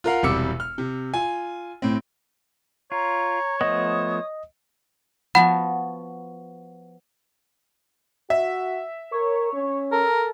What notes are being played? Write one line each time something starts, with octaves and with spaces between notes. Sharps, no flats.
F4 A#4 F5 F#5
E1 C3 G3 D6 E6 C#7
F6
C3
F4 G#5
A2 C4
F4 C#5 A#5
F3 A3 B3 D#5 D#6
F3 B3 F#4 F#5 B5
F#4 E5
A#4 C#5
C#4
A4 A#4